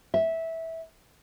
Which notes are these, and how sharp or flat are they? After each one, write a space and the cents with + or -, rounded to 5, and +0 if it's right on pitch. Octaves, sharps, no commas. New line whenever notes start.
E5 -15